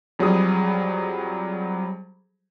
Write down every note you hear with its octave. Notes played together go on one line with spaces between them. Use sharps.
F2 F#3 G3 G#4 D#6